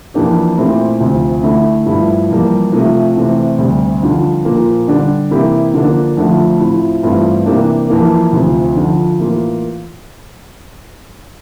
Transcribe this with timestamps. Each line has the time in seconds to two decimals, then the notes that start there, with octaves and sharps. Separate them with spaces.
0.14 F2 E3 A#3 D4 G4
0.57 A#2 A3 C4 E4 G4
1.00 D2 C3 F3 C4
1.43 D3 A3 E4
1.86 G2 F3 A3 E4 G4
2.29 F2 E3 G3 A#3
2.72 C3 F3 A3
3.16 C3 E3 A3 C4
3.58 D2 C3 G3
4.02 F2 D3 G3 D4 F4
4.45 A#2 F3 A#3
4.88 D3 G3 D4
5.30 C3 E3 A#3 E4 G4
5.74 D3 F3 A#3 D4
6.17 F2 D3 F3 A3
6.59 A2 F3 C4 E4
7.03 G2 E3 A3 C4 F4
7.46 C3 E3 A#3 D4 G4
7.89 F2 E3 A#3
8.32 D2 C3 F3
8.75 F2 D3 F3
9.18 A2 E3 A#3 F4